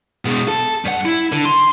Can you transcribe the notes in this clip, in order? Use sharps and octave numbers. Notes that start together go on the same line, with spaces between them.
B2 G#3
A4
G2 F#5
E4
D3
C6